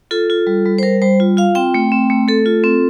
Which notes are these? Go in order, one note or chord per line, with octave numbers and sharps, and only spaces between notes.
F4 A4
F4
G3
G3
C5
G3 A#4
G3 C5
F4
F4 F5
C4 G5
A3
C4
A3
A3 A4
F4
C4